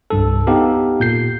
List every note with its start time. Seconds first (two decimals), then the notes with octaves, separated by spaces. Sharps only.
0.10 C2 G2 A4
0.47 B3 D#4 G4 A4 F5
1.00 A#2 G6 C7